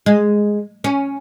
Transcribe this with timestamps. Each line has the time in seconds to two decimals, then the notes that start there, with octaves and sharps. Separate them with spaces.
0.06 G#3
0.84 C#4